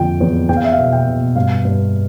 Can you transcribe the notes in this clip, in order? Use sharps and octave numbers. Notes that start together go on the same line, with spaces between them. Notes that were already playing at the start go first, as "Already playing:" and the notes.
Already playing: F2 D3 F3 G5
E2
E2 G5
F5
E5
F5
B2
G5
B2
G2 F5
G2